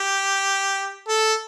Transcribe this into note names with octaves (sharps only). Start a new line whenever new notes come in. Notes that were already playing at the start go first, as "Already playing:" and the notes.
Already playing: G4
A4